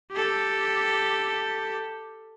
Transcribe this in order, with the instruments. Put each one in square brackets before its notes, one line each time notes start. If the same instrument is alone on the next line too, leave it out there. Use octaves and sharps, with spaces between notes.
[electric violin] G4 A4